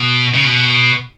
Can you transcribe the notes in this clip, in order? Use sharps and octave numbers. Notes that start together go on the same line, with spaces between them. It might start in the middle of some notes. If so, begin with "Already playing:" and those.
Already playing: B2
C#3
B2